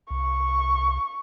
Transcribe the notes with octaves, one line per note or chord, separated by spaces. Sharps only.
C2 C#6